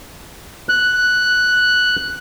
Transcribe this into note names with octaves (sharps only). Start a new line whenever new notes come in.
F#6